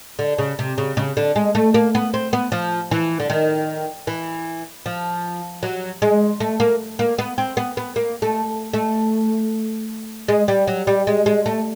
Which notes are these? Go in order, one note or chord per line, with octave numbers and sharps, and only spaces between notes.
D3
C#3
C3
C#3
C#3
D3
G#3
A3
A#3
B3
C4
B3
F3
E3
D3
D#3
E3
F3
F#3
G#3
A3
A#3
A#3
B3
C4
B3
B3
A#3
A3
A3
G#3
G3
F#3
G3
G#3
G#3
A3